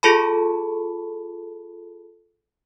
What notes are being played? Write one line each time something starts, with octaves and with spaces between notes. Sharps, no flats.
F4 G#4 A4 A5 B5